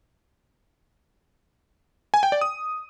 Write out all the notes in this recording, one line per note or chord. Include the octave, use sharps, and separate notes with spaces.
G#5
G5
D5
D#6